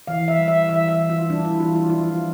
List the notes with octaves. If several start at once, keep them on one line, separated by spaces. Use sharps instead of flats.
E3 F5
E5
G3
E5
E3 E5
E5
E3
F4
G3 D4
E4
E3 F4
F4
F3 F4